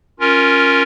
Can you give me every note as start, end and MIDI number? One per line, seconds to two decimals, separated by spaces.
0.20 0.83 61
0.20 0.83 65
0.20 0.83 70